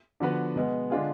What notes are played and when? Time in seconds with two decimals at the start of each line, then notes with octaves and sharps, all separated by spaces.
0.20 D3 F3 B3 F#4 B4
0.56 B2 G#3 B3
0.90 D3 G#3 D4 F4 G#4